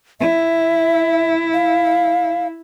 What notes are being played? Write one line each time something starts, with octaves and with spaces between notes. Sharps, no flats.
E4 E5
F5